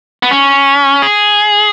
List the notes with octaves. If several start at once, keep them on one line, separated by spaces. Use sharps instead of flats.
B3
C#4
G#4